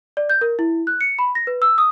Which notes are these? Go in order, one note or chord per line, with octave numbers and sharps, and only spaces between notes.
D5
G6
A#4
E4
F#6
C#7
B5
A#6
B4
E6
D#6